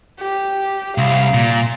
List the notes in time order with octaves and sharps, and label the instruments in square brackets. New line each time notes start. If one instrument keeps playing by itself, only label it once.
[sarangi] G4
[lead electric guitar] C2 [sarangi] F5
[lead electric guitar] A#2